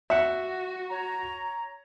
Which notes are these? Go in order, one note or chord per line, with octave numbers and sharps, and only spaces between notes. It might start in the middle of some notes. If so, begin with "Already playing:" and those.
F#4 E5 F#5
C#5 A#5